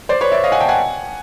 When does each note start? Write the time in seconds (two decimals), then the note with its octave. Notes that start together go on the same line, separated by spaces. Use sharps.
0.09 C5 D5
0.21 B4 C#5
0.32 D5 E5
0.44 D#5 F5
0.52 F#5 G#5
0.61 G5 A5
0.69 F#5 G#5